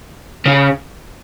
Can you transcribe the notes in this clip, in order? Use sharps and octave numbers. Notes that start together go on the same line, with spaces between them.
C#3